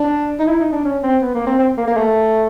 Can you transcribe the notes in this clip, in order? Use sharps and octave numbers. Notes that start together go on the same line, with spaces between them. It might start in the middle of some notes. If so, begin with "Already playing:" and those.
Already playing: D4
D#4
E4
D#4
D4
C#4
C4
B3
A#3
C4
C4
A#3
A#3
A3